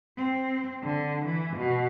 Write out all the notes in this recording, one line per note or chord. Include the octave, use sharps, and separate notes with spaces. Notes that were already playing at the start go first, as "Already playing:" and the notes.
C4
D3
E3
B2